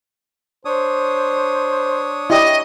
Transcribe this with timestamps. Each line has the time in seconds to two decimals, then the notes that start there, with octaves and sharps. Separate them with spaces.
0.65 D4 C5 C#5 D#6
2.30 E4 G4 D5 D#5